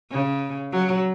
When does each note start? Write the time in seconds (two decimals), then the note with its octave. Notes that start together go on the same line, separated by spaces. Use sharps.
0.11 C#3
0.72 F#3